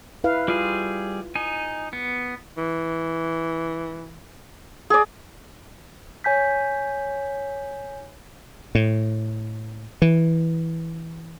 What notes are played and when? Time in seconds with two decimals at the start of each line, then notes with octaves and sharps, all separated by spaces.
0.24 E4 B4 F5
0.48 G3 F4 G#4
1.36 D#4 G#5
1.93 B3
2.57 E3
4.90 G#4 D5
6.24 C#5 G#5 G6 B6
8.75 A2
10.02 E3